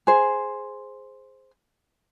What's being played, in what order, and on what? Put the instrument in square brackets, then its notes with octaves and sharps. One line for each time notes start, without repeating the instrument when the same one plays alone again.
[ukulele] G#4 C5